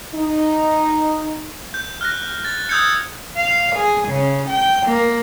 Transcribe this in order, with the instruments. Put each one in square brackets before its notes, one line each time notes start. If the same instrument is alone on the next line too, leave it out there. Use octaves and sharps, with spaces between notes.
[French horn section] D#4
[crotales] G6
F6 F#6 A#6
A6
D#6 E6 G6 G#6 C#7
[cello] F5
G#4
C#3
G5
A#3